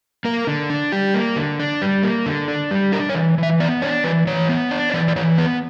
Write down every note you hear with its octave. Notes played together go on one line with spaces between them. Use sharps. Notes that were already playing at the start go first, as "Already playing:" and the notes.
A#3 A#4
D3
D4
G3 G4
A#3
D3
D4
G3
A#3
D3
D4
G3
D4 A#4
C#5
E3
E3 E5
B3 D5
D4 C#5
E3 B4
E3 C#5
B3
D4
C#5
E3 D5
D5
E3 C#5
B3 B4